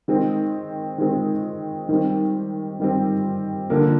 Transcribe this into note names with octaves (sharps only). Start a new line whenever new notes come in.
D#3 G#3 C4
D#3 G#3 C4
D#3 G3 C4
D#3 G3 C4
D3 F3 A#3